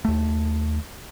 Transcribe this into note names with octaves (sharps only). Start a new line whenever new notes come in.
D#2 A3